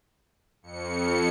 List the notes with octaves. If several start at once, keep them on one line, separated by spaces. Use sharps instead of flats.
F2 C#7